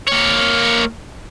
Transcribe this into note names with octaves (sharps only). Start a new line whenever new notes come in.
A#3 C#5